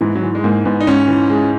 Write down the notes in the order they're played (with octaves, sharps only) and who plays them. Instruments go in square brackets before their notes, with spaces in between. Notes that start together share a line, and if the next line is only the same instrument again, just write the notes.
[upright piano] G#2 [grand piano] E3
[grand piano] F#3
[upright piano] E3
[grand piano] G#3
[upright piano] G#2 [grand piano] A#3
[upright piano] G#2 [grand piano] B3
[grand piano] D#4
[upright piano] G#2 [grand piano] C#4
[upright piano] E3
G#3